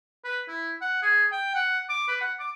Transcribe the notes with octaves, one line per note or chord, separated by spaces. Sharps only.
B4
E4
F#5
G#4
G5
F#5
D6
B4
F#5
D6